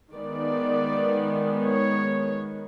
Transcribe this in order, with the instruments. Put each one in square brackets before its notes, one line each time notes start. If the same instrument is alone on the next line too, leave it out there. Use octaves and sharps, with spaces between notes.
[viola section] D#3 G#3 B3 D5
C#5